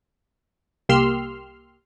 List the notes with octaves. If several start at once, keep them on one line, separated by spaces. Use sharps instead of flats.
C2 A#3 G4 C6 E6 F6